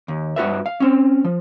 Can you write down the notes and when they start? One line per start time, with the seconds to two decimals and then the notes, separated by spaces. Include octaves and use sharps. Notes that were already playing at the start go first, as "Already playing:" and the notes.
0.08 D#2
0.36 G2 F#4 B4 E5
0.66 F5
0.80 C4 C#4
1.24 F3